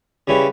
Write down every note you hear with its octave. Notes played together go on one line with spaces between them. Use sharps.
C#3 G3 C#4 E4 B4